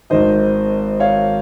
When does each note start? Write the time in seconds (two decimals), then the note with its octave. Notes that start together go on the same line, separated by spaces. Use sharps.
0.10 G#1 G#2 D#3 C5 D#5
1.00 C#5 F5